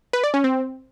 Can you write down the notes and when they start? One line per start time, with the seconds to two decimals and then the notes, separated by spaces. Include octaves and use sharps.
0.13 B4
0.24 D5
0.34 C#4
0.44 C4